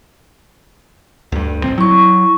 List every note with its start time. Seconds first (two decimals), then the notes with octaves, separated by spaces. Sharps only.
1.32 D2 G2
1.64 A1 C3 C4
1.78 F#3 E4 C#6